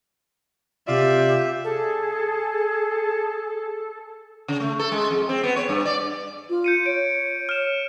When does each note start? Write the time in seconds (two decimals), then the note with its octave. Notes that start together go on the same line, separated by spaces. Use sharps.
0.88 C3 F4 G4 D5 E5
1.64 G#4 A4
4.48 C#3
4.60 A3
4.79 A4
4.92 G#3
5.11 F2
5.29 C4
5.44 B3
5.56 C#5
5.69 G2
5.85 D5
6.50 F4
6.64 G6 C#7 D#7
6.86 C#5 D7
7.49 F6 E7